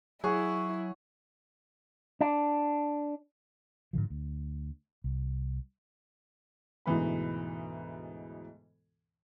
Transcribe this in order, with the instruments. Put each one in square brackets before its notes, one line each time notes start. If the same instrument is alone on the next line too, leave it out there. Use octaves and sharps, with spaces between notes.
[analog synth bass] F#3 [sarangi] E4 [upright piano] G#4 [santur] C#5 F#5
[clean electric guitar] D4
[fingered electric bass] G#2 B2 D3 F3
D2
C2
[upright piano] D2 G#2 B2 E3 B3 B5